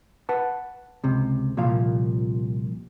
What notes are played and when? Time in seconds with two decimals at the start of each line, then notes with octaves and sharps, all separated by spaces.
0.29 B4 F#5 A5
1.04 C#2 C3
1.57 C2 A#2 F3 F5